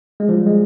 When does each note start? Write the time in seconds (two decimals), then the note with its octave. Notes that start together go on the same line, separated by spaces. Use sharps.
0.20 G#3
0.29 F3
0.37 G3
0.46 G#3